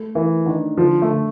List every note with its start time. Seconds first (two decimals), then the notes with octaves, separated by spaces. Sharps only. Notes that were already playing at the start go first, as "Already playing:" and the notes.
Already playing: A3
0.15 E3 A#4
0.46 D#3 D4
0.78 D3 F3
1.02 A3
1.09 D3